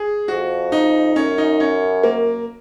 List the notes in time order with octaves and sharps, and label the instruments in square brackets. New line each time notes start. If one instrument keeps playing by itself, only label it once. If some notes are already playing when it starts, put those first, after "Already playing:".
Already playing: [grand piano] G#4
[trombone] F2 [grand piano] F#4
[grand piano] D#4
[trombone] F#2 [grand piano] C#4
[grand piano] D#4
C#4
A#3